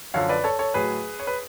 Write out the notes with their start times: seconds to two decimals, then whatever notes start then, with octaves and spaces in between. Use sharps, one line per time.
0.14 F#2 D3 F3 C#5 F5
0.29 B4 D5
0.44 A4 C#5
0.59 A4 C#5
0.74 A2 F#3 G#4 B4
1.20 C#5
1.27 B4